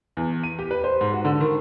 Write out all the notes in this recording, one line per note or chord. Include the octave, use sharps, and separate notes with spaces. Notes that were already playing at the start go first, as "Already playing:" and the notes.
E2
D#7
G4
B4
C5
G#2
F#4
D3
D#3